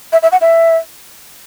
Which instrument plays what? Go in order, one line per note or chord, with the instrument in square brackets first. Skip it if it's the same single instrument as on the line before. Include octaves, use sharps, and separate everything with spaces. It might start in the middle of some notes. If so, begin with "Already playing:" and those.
[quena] E5
E5
F#5
E5